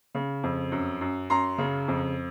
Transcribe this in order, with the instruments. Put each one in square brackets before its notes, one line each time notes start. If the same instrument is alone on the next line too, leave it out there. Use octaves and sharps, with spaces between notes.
[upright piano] C#3
F2
F#2
F#2
F#2 A#5 C6
C#3
F2